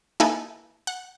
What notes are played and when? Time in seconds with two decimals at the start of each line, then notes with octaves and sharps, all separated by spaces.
0.20 A#3 D#4 E4 A4 B4 G#5
0.87 F#5